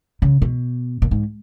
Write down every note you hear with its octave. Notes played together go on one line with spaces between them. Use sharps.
C#3
B2
A#2
G#2